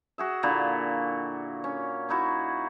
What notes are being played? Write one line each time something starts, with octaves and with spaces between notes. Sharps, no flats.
F#4 G#4 E5
A#2 D3 A#3 E4
C#4
C#4 D#4 E4 F#4